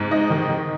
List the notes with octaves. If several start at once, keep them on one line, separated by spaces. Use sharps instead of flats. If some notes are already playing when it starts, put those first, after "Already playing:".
Already playing: G#2
D#4 D#5
D#3
D#3